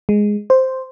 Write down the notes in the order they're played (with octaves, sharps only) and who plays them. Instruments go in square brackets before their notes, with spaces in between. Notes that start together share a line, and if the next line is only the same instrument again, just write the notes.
[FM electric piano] G#3
C5